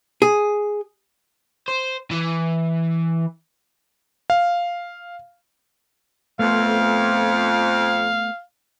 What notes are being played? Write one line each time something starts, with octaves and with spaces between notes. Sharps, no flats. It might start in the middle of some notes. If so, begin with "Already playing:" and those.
G#4
C5
E3
F5
F2 A3 B3 F5